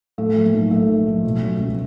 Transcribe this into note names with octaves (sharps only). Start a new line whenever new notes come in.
A2 A3
F3
A#3
B1
B1 A3
A2
F3
B2
F#3
C#2